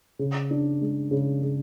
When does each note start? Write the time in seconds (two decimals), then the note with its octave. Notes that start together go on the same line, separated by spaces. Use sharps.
0.19 C#3
0.51 D4
0.81 G#3
1.11 C#3
1.43 C#3